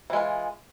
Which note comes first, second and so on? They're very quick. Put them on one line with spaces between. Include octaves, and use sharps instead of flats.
E3 G#3 F4